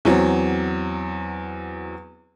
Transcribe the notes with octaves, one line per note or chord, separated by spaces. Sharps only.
E2 F#3 C4